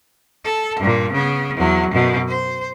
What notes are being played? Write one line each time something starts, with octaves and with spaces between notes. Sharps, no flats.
A4
G2 A#2
C#3 B3
E2 F#3
F#2 B2
C5